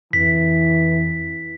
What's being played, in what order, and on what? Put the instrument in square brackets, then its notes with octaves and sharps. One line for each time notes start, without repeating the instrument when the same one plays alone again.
[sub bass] F2 [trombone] E3 [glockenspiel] B6